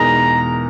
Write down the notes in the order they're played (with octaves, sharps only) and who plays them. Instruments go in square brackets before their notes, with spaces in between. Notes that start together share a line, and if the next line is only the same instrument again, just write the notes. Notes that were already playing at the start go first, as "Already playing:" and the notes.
Already playing: [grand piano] E2 B2 G#3 D#4 A#4 [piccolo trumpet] A#5